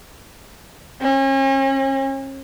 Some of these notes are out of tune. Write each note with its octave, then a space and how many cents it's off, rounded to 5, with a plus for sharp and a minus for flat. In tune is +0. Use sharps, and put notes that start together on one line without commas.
C#4 -40